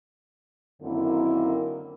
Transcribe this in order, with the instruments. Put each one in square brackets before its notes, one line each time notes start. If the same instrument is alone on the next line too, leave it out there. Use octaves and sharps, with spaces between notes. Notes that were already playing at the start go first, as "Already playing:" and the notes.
[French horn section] F#2 D3 D#3 A#3 C4 E4